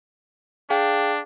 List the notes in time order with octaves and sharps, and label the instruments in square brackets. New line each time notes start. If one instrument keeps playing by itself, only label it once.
[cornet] D4 [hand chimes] G#4 F5 G5